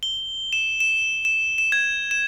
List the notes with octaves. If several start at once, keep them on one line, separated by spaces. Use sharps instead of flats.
G7
E7
E7
E7
E7
G#6
E7